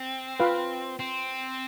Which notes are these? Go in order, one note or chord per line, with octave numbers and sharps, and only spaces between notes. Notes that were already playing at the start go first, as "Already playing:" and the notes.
Already playing: C4
F4 B4 F5
C4